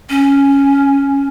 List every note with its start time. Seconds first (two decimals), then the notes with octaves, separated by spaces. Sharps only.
0.10 C#4